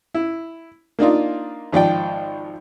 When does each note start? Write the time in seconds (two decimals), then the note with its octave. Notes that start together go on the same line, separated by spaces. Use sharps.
0.14 E4
0.99 A#3 D4 D#4 F4
1.72 G#1 F3 D5 G5